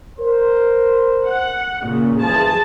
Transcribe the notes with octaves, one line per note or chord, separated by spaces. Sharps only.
A#4 C5
F#5
A#2 C#3
F#1 E3 F3 G#4 A5